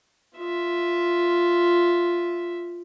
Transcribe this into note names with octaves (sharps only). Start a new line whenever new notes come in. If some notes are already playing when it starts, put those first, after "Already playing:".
F4 E5